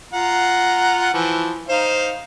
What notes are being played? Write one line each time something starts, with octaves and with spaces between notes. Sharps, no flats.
F4 F#5 A#5
E3 F3
D#4 C5 F5